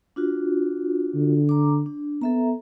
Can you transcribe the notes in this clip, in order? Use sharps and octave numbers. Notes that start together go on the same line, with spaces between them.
D4 F4 F#4
D3
A#5 D6
D4
B3 A4 E5 A#5